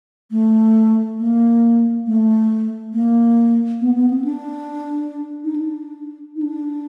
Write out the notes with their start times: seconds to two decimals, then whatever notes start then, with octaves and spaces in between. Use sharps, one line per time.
0.31 A3
1.19 A#3
2.07 A3
2.93 A#3
3.81 B3
3.96 B3
4.10 C4
4.24 D4
5.44 D#4
5.56 D4
6.36 D#4
6.43 D4